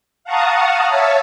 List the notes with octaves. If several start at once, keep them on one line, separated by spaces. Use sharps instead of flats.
F5 F#5 A5 A#5 C#6 D#6
C#5 E5 F5 A5